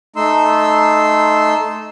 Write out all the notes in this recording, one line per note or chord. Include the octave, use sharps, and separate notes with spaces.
A3 D#4 C6 E6